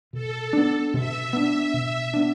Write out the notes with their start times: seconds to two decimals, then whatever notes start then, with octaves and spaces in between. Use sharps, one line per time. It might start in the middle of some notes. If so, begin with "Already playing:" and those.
0.13 B2 A4
0.53 B3 D4
0.93 B2 E5
1.33 B3 D4
1.73 B2
2.13 B3 D4